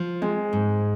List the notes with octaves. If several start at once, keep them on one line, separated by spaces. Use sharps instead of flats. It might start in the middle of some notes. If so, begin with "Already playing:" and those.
Already playing: F3
G#3 C4
G#2